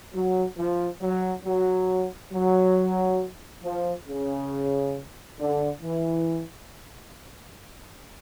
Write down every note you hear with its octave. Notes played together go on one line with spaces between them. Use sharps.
F#3
F3
F#3
F#3
F#3
F3
C#3
D3
E3